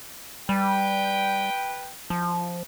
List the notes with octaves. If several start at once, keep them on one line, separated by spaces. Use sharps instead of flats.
G3 B4 G5
F3